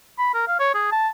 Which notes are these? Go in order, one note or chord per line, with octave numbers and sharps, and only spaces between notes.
B5
A#4
F5
C#5
G#4
A5